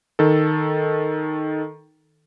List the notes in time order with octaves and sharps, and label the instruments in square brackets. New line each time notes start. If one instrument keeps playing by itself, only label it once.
[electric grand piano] D#3 A4